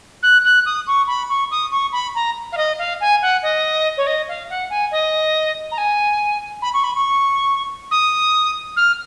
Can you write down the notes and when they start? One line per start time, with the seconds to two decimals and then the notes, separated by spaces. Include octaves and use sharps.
0.22 F#6
0.44 F#6
0.65 D#6
0.87 C#6
1.07 B5
1.29 C#6
1.51 D#6
1.71 C#6
1.92 B5
2.15 A#5
2.52 F5
2.57 D#5
2.78 F5
3.00 G#5
3.21 F#5
3.42 D#5
3.97 C#5
4.06 D#5
4.28 F5
4.49 F#5
4.70 G#5
4.91 D#5
5.71 A#5
5.77 G#5
6.62 B5
6.73 C#6
6.83 B5
6.94 C#6
7.91 D#6
8.76 F6